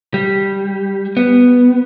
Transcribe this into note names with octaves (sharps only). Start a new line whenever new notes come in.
G3
B3